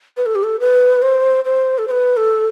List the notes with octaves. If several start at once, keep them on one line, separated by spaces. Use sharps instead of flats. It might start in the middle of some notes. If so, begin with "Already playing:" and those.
B4
A4
G4
A4
B4
C5
C5
A4
C5
B4
A4